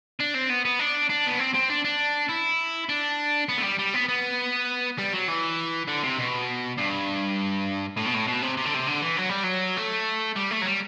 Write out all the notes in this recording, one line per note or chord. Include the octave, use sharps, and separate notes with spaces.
D4
C4
B3
B3
D4
D4
B3
C4
C4
D4
D4
E4
D4
B3
A3
G3
G3
B3
B3
G3
F#3
E3
D3
C3
B2
G2
A2
B2
A2
B2
C3
C3
D3
C3
D3
E3
F#3
G3
F#3
A3
G3
A3
F#3
G3